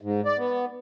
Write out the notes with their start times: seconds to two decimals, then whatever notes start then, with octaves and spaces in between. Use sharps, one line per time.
0.02 G#2
0.25 D5
0.37 B3